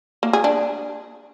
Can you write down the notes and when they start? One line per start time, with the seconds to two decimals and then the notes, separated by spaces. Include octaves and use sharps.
0.23 A#3
0.33 G#4
0.44 D4